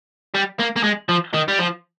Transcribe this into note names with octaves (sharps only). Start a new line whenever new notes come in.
G3
A#3
A#3
G#3
F3
D#3
G3
F3